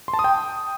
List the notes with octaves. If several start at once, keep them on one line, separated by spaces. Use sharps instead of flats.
C6
A5
D#6
G5